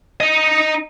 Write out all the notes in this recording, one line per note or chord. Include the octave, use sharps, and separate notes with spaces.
D#4 D#5